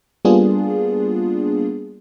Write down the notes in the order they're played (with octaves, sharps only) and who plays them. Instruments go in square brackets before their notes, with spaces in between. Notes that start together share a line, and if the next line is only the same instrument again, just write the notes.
[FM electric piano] G3 A#3 B3 D4 F4 G#4